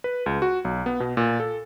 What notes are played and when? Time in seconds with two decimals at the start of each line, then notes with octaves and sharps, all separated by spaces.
0.04 B4
0.26 C#2
0.42 F#4
0.65 B1
0.86 B3
1.00 B2
1.17 A#2
1.40 A4